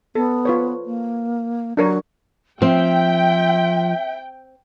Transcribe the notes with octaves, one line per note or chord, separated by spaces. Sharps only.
B3 A4
F4 B4 C#5
A#3
F#3 D4 A#4 C#5
F3 C4 E5 G5